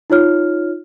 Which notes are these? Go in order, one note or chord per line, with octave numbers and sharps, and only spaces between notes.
D#4 F4 C#5 F6